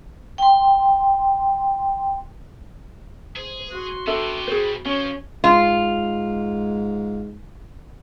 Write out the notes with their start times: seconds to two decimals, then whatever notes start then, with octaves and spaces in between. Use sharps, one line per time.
0.38 G5 C6
3.36 G#4 C5
3.71 F#4 C6
4.07 B3 D4 G4 A4 E5
4.47 B2 G3 G#4 C5
4.85 F3 C#4 C#5
5.44 G#2 F4